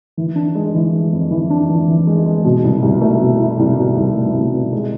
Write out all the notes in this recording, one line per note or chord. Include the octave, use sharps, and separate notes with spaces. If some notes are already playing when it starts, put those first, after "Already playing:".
E3
D4
G#3
E3
G#3
F2
E3
D4
E3
E3
G#3
G#3
B2
C2
C2
A3
B2
E4
C2
B2
C2
A3
C2
B2
G#3